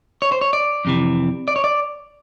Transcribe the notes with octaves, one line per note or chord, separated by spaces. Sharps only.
C#5
C5
C#5
D5
F2 C3 E3
D5
C#5
D5